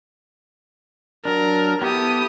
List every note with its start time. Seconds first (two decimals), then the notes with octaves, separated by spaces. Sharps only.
1.25 F#3 D4 A#4
1.82 B3 E4 G4 A4 D#6